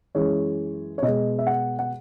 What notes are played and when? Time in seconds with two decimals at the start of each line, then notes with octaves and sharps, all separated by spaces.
0.15 F#2 E3 G#3 C#5
0.98 C#5
1.02 B2 G#3 D#5
1.39 E5
1.47 F#5
1.79 F#5